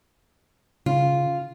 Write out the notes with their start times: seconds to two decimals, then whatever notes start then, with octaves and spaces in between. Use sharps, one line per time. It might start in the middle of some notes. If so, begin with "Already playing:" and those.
0.86 C#3 F4